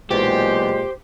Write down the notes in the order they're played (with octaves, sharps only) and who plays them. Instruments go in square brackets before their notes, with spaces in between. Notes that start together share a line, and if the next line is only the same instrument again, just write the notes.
[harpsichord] B1 E2 [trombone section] A#2 G#3 [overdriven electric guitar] G4 [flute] C5